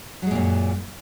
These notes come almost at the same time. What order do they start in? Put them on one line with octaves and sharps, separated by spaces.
F#3 G#3 A#2 F#2